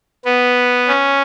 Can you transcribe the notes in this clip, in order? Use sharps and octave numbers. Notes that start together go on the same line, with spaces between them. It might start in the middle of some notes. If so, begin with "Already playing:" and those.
B3
C#4